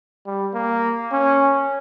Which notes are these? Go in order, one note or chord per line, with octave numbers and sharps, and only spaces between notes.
G3
A#3
C#4